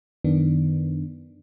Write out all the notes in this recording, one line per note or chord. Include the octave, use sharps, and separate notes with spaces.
F#2 D#3 B3 D4